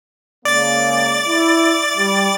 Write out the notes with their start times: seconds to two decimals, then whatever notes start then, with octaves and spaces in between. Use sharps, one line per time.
0.45 C#3 G#3 A#3 D5 A6
1.27 E4
1.96 G3